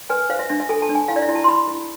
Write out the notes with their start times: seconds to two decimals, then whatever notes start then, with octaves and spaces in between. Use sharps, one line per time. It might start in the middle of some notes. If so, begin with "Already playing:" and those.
0.10 B4 G#5
0.30 C5 F5
0.39 E5
0.49 D4 E5
0.60 E5
0.69 A4 G#5
0.82 A5
0.89 D4
0.95 G#5
1.08 E4 F5
1.16 D5
1.22 E5
1.29 E4
1.35 A5
1.44 C6
1.48 E4 B5
1.68 E4